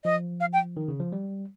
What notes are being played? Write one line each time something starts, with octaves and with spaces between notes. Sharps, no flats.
F3 D#5
F5
G5
D#3
C#3
F3
G3